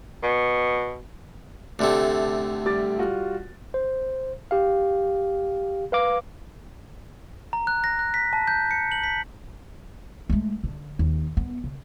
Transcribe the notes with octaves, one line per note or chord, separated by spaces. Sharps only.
B2
D2 C3 A3 D5
G3 D6 A6
G3 F4 F#4
C5
G4 F5
B4 F5 D6
A#5
F#6
A#6
F#6
B6
A5
G6
C#7
F#7
B6
G#3 A3
D3
D#2
B3
C#3